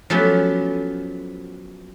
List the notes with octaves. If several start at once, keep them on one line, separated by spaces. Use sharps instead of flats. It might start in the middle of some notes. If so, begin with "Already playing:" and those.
F3 F#3 A3 B3 C#4 G4